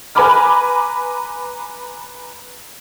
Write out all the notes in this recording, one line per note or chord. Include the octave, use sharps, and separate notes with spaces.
B4 G#5 A#5 B5 D6 F6